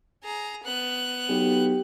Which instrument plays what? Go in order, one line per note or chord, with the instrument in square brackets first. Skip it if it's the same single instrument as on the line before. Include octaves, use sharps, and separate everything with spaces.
[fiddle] G#4 A#5
B3 F#6
[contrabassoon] B1 [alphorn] G4